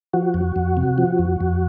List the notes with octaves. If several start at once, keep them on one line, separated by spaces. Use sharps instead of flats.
F3 F#4
F2
F2
C3
F3
F2
F2